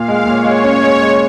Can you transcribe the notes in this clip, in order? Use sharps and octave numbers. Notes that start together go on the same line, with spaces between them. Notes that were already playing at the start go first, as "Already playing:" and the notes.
Already playing: A#2 F5
G#3
A#2 C#5
G#3
C#4
G#3
G#3